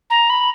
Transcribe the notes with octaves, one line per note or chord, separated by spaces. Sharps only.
A#5
B5